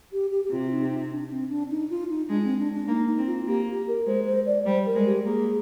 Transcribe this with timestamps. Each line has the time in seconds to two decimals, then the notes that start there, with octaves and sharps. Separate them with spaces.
0.13 G4
0.31 G4
0.45 G4
0.51 C3 F4
0.72 D#4
0.90 D#4
1.11 D4
1.30 C4
1.50 D4
1.70 D#4
1.90 F4
2.09 D#4
2.29 G#3 D4
2.44 C4
2.59 D4
2.73 D4
2.88 A#3 D#4
3.08 D#4
3.18 C4
3.27 F4
3.47 A#3 G4
3.68 G4
3.88 A#4
4.06 G#3 C5
4.26 C5
4.46 D5
4.65 G3 C5
4.86 A#4
4.96 G#3
5.06 G4
5.25 A#3 G#4